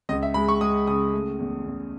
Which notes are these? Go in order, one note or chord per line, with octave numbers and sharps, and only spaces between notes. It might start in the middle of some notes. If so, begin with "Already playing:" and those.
C#2 D#5
E5
G#3 B5
C#6
G#3 D#6
C#3 D#6
A3
E2
E2